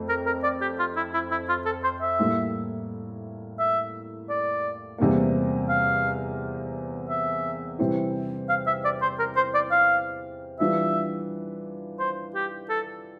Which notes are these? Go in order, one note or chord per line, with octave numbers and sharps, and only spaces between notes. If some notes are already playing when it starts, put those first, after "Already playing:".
Already playing: F2 A3 C4
A#4
A#4
D5
G4
F4
E4
E4
E4
F4
A4
C5
E5
A2 G3 A#3 E4
E5
D5
E2 C3 G3 A#3
F5
E5
C3 E3 G3 C4 E4
F5
E5
D5
C5
A#4
C5
D5
F5
E3 G3 D4 F4 E5
C5
G4
A4